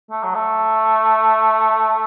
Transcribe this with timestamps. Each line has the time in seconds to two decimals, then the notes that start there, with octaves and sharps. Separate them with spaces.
0.11 A3
0.23 F#3
0.35 A3